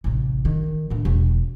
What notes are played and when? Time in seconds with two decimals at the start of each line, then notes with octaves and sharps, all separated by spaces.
0.04 A1 C3
0.45 D#3
0.90 A2 D3
1.05 E1